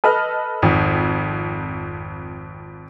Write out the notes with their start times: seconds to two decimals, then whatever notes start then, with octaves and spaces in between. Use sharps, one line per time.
0.04 A4 B4 D#5 F6
0.62 G#1 F2